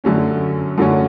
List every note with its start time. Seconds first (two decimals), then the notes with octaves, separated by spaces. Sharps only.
0.04 F#2 D3 F#3 A3 C#4
0.78 F#2 D3 F#3 A3 C#4